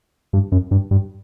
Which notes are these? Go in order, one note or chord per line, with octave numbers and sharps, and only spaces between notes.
G2
F#2
G2
G2